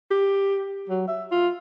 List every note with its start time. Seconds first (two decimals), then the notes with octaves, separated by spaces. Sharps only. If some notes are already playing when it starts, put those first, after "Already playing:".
0.11 G4
0.89 F#3
1.08 E5
1.31 F4